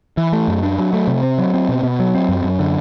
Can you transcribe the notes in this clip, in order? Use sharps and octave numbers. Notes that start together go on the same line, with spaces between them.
E3
A3
F#2
D4
F#3
A3
C3
C4
F#3
C4
B2
B2
F#3
C4
F#2
F#2
D3